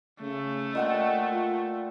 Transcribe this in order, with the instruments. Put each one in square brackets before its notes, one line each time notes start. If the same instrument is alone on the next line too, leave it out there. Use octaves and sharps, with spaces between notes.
[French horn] C#3 [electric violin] A3
[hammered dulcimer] A#2 F#5 G5 [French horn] D#5
[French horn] F4